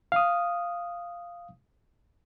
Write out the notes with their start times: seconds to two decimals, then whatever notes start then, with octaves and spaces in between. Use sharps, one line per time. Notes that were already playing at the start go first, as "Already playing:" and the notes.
0.12 F5 D#6